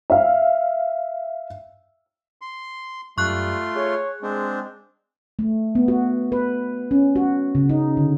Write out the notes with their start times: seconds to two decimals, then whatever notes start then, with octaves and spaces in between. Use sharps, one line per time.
0.10 E5 F5
2.41 C6
3.18 F#2 G3 A3 F4 C6 C#6 F#6
3.76 G#4 C#5
4.23 G#3 C4 D4
5.39 A3
5.75 B3
5.88 F#4
6.32 B4
6.91 C#4
7.16 F#4
7.55 C#3
7.70 D#4
7.97 D3